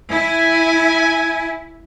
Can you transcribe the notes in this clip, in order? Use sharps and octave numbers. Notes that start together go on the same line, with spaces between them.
E4 G#5